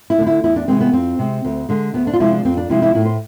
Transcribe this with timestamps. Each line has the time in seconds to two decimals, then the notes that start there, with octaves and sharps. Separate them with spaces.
0.10 E4
0.18 D3 A3
0.27 E4
0.44 E2 E4
0.56 D4
0.68 C3 E3 G#3 C4
0.81 B3
0.93 F2 C4
1.19 C3 G#3
1.45 D2
1.69 D3 G#3
1.94 D2 B3
2.07 D4
2.13 F4
2.20 C3 F3 G#3 E4
2.32 D4
2.45 F2 C4
2.57 D4
2.69 C3 F3 G#3 E4
2.82 E4
2.95 A2 E4
3.05 C5